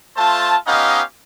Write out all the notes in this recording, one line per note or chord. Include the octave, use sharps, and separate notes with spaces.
A3 F4 C5 A5
B3 C#4 D#4 G4 D#5 F5